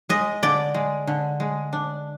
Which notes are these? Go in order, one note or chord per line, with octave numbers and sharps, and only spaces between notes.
G#3 D#5
D3 D5
G#3
D3
G#3
D4